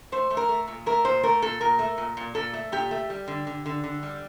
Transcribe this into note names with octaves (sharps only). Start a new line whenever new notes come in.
A3 C5
A3
A#4
A3
A#2
A3 A#4
A#2 C5
A3 A#4
A#2 A4
A#2 A#4
A3
A#2
A#2
A#2 A4
A3
A#2 G4
A3
G3
D3
D3
D3
D3
G3